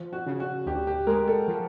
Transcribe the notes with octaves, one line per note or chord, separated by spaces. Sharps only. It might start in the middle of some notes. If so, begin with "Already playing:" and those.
Already playing: F3
F#4
C#3
F#4
D2 G4
G4
G#3 A#4
A4
F3